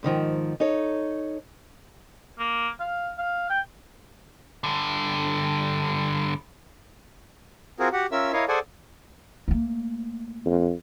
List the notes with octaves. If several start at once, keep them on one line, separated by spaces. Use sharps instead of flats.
G#2 D3 D#3 F3
D#4 A4 C#5
A#3
F5
F5
G5
G2 D3
C4 F4 F#4 G#4 A#4
F#4 G4 F#5
C#4 F4 A#4 E5 E6
E4 A#4 C#5 D#5 F5
G#4 A4 C5 D5 F#5 G#5
A3 A#3
F2